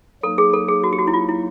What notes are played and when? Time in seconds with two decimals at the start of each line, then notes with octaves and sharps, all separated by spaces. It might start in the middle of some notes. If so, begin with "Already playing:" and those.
0.23 F#3 A#3 D#4 A4
0.38 G#4
0.53 A4
0.68 G#4
0.84 F#4
0.93 G4
0.99 F#4
1.07 E4
1.13 F4
1.29 E4